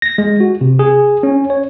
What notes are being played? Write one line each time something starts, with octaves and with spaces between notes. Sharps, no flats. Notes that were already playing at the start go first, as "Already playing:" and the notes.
A#6
G#3
F#4
C3
G#4
C#4
C#5